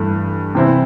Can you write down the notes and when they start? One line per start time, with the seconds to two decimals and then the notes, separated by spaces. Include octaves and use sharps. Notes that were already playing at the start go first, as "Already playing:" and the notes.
Already playing: G2 E3 A3
0.55 C3 E3 C4 E4